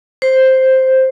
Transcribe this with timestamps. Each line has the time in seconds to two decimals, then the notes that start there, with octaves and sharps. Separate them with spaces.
0.22 C5